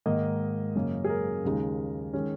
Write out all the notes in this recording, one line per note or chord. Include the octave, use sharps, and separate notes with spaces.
G#2 D#3 A#3 D#5
F#2 C#3 A#3 C#4
G#4
A#4
D#2 C#3 G#3 D#4
D#3 G#3 C#4